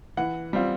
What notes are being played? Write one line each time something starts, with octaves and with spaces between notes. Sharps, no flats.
E3 F#5
G3 C4 F4